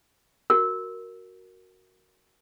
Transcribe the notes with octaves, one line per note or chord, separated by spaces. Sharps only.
F#4 A#4